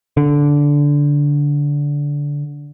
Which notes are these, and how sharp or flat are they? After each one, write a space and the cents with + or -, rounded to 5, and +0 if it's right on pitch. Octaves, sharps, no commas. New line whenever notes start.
D3 -15